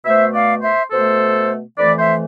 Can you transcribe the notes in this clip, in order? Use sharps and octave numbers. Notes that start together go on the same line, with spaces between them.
B2 A3 C5 E5
D5 F5
C5 E5
B2 A3 A4 C5
F2 E3 A3 B4 D5
C5 E5